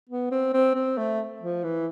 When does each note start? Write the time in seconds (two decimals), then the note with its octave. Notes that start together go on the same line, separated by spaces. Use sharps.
0.09 B3
0.31 C4
0.53 C4
0.75 C4
0.97 A3
1.42 F3
1.64 E3